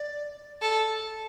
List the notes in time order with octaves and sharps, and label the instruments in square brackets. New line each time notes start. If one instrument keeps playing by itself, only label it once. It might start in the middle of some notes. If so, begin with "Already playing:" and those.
Already playing: [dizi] D5
[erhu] A4